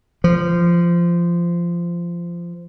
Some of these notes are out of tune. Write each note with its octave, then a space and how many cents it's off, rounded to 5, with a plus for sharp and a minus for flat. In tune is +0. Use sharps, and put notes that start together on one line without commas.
F3 -20